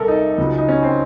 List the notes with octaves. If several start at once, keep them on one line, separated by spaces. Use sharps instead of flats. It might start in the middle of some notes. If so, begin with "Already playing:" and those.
Already playing: C2 C3 A4 A#4
D#4
C#2 C#3 F#3
D#4
C#4
C4